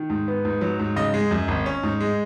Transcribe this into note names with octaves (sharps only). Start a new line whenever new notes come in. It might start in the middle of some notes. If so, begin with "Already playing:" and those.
Already playing: D#3
G#2
B3
G#2
F#3
G#2
C#3 D#5
G#3
F#2
G#1
C#4
G#2
G#3